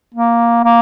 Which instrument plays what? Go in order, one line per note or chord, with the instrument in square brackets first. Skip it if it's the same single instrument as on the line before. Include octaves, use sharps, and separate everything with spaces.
[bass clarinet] A#3
A#3